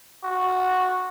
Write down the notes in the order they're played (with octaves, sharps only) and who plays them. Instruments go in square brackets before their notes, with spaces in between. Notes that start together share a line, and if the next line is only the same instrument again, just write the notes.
[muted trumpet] F#4